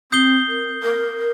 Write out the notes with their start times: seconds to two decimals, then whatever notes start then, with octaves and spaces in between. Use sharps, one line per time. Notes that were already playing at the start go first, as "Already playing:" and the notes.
0.12 C4 D#6 G6 C7 G7
0.48 A#4
0.83 A#4
1.18 A#4